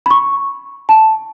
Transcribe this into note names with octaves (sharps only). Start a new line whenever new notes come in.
B5
C#6
A5